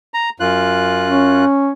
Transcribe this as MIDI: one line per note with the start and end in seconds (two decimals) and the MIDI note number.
0.14 0.30 82
0.40 1.45 42
0.40 1.45 65
0.40 1.45 90
1.07 1.72 61